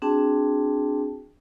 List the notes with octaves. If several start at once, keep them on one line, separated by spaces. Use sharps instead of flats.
C4 D4 F#4 G#4 G5 A5